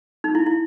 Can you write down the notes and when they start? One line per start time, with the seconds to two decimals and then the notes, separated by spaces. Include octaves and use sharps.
0.24 D#4
0.35 E4
0.46 E4